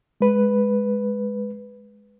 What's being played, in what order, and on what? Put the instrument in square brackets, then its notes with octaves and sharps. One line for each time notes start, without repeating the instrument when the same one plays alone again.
[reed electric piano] G#3 B4